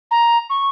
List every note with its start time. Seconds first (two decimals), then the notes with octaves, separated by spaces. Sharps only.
0.11 A#5
0.49 C#6